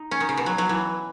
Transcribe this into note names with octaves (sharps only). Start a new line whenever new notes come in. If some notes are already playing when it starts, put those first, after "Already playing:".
Already playing: D#4
C#4
D#3
C#3
B2
F#3
F#3
E3